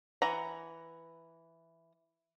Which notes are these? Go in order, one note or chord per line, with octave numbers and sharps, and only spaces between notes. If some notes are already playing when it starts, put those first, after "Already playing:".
E3 F#5 A#5